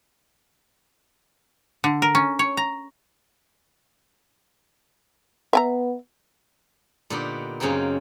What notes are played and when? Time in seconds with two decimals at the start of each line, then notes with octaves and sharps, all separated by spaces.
1.84 D3
2.02 A#4
2.15 C#4
2.39 C#5
2.57 A#5
5.53 B3 E5 G#5 A#5
7.10 A#2 D3 B3 D#4 G4 A#4
7.60 F#2 C#3 A#3 C4 D#4